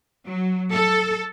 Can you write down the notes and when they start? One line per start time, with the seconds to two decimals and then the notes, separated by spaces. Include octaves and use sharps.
0.25 F#3
0.74 A4